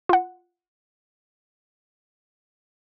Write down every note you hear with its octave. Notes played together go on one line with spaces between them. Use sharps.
F4 F#5